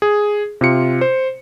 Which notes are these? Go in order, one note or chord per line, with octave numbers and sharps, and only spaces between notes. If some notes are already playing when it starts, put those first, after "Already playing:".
G#4
C3 F4 C#7
C5